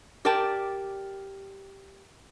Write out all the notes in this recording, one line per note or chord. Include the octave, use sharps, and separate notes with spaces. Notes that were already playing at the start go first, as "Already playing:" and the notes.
G4 A#4 D5 G5 A5